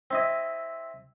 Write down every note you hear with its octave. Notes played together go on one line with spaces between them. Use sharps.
C4 E4 D#5